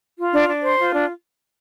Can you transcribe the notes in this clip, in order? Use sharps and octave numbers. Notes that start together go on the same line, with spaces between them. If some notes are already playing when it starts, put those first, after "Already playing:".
F4
D4
D4
C5
F4
D4